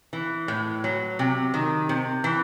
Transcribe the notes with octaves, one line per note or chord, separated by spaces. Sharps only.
E3
A2
F#3
C3
D#3
C3
E3